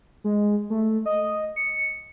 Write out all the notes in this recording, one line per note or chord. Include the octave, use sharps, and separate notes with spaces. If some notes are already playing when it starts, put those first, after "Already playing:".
G#3
A3
D#5
C#7